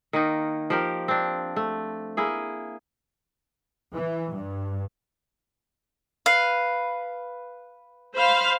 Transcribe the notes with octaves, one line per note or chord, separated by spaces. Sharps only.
D#3 A#3 D#4
F3 G4 A#4
C4 D4
A3
A#3 E4 G#4
E3
G2
B4 F5
C5 F5 B5